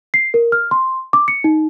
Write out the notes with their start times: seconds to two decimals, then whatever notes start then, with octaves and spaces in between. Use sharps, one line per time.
0.14 C7
0.34 A#4
0.52 F6
0.71 C6
1.13 D6
1.28 C#7
1.44 D#4